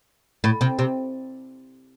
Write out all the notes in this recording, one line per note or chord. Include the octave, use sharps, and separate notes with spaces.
A2
C3
C3